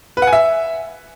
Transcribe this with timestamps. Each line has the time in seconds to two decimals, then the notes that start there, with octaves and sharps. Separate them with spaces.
0.17 B4
0.22 F#5
0.27 G#5
0.33 E5